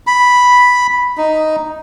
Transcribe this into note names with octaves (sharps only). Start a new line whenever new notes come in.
B5
D#4